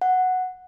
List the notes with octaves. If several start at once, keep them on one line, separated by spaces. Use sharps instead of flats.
F#5